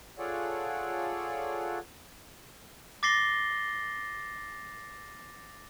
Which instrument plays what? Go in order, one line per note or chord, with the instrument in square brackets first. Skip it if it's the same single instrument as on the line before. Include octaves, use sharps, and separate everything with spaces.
[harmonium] F4 G#4 A4 C#5 D5 F#5
[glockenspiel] D6 A6 A#6 C7 G7